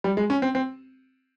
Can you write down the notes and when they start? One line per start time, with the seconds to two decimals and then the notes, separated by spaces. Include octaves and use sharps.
0.04 G3
0.17 G#3
0.30 C#4
0.42 C4
0.55 C4